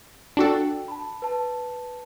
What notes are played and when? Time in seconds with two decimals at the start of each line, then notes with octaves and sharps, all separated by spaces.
0.37 D4 F#4 A4 G5
0.88 A5 B5
1.22 B4 A5